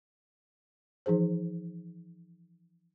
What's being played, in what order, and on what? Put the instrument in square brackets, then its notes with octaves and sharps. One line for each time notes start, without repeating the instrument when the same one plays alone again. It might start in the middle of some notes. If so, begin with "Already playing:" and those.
[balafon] E3 F3 D#4 G#4 C5